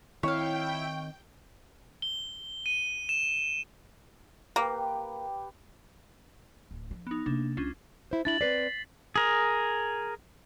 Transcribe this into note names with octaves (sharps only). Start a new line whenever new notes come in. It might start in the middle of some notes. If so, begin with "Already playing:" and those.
D#3 C4 E4 C#5 F5 G5
G7
D#7
E7
A#3 G4 B4 G5
D1
F3 D4
B3 D#4
C3 A#3 D4
C#2 C#4 D4 F4
E4 C5
D4 E4 A6 F#7
C4 B4 D5 B6 C7
G#4 A#4